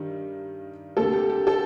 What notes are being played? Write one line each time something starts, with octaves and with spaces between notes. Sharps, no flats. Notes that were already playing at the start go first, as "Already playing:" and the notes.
Already playing: G2 D#3 G3
D2 C3 G3 A#3 A4
G4
G4
A4